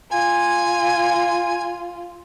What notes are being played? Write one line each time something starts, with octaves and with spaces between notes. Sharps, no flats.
F4 G#5